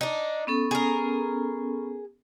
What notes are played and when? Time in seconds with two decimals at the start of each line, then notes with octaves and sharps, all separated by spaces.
0.01 D4 D#4
0.47 B3 C#4 A4
0.71 G#4 A#4